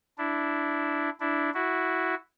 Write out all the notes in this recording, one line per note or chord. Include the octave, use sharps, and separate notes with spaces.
D4 E4
D4 E4
E4 F#4